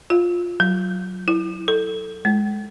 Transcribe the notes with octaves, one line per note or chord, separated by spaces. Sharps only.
F4
F#3
E4
A4
G#3